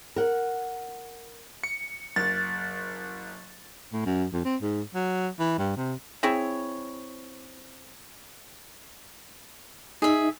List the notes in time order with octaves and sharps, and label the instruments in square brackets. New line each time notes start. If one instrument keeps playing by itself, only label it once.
[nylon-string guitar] A#4 F#5
[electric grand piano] C#7
[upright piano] F#1 [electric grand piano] A6
[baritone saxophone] A2
F#2
F2
C4
G#2
F#3
E3
G2
C3
[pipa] C4 E4 G#4 C#5
[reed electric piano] D#4 [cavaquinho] G#4 E5